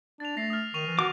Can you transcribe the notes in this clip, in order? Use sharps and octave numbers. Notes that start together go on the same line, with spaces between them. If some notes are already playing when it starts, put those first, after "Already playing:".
D4 A6 F7
A3 A#6 C7
D#6 F6
D#3 C#6 D#7 F7
E3
F#4 D6